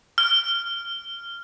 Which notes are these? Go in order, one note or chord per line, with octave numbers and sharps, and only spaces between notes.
F6